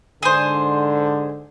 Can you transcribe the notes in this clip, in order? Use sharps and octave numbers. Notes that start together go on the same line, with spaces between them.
G#2 D3 G#4 C5